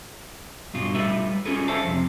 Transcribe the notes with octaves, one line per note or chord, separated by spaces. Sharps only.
G2 B2 F4
G3 A3 F4 B4 E5
C#4 F4 G#4 A4 B4
A4 C5 E5 F5 A5
F2 C3